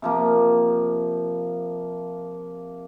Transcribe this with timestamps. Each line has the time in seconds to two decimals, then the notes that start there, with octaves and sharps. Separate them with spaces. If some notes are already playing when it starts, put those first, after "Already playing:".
0.02 C3 F3 A#3